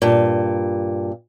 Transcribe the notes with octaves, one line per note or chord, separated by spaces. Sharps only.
G2 A#2